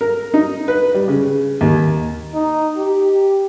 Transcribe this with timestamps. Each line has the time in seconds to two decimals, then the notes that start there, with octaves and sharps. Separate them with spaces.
0.01 A#4
0.34 D#4
0.68 B4
0.95 G3
1.08 C#3
1.61 D#2
2.34 D#4
2.77 G4